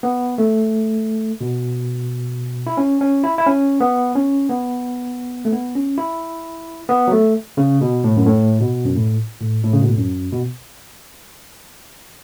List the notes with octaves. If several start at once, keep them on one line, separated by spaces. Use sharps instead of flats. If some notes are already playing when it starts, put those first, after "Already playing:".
B3
A3
B2
E4
C#4
C#4
E4
E4
C#4
B3
C#4
B3
A3
B3
C#4
E4
B3
F#3
A3
C#3
B2
A2
F#2
A2
B2
F#2
A2
A2
A2
C#3
B2
A2
F#2
B2